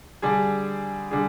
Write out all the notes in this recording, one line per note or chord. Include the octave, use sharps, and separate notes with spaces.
D3 G3 D4 G#4
D3 G3 D4 G#4